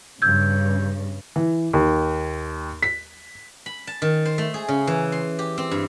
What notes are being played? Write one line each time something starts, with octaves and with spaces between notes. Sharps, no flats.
G2 C#3 E6 G6 G#6
E3
D#2
B6
B5
A5
D#3
C5
A3
G#4
C#3
E3
C6
G4
C4
G2